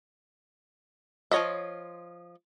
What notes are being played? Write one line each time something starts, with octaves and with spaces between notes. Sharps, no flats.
F3 F4 C#5 D#5 E5